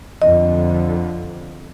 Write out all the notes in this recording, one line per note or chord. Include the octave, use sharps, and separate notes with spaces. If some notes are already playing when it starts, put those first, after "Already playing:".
F2 D3 D#5